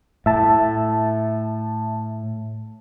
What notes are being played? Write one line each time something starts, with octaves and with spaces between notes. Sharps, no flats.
A2 E5 A5